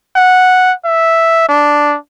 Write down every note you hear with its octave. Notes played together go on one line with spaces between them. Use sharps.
F#5
E5
D4